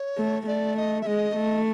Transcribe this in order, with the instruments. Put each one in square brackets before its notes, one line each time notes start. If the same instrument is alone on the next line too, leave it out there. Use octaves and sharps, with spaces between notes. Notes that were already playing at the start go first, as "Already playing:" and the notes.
Already playing: [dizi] C#5
[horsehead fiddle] A3
[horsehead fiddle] A3 [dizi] D5
[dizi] D#5
E5
[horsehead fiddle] G#3 [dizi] D#5
[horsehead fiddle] A3